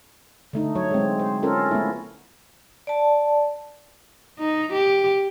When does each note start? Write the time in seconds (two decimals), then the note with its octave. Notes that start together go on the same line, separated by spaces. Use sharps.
0.53 D3 A3 D#4
0.75 F#3 C#5
0.91 G#3 C4
1.19 C5
1.43 C#4 F4 A4 A#4
1.71 A3 B3 E4
2.87 D5 A5
4.38 D#4
4.72 G4